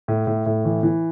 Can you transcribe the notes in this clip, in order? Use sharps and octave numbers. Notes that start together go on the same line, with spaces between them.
A2
A2
A2
E3
E3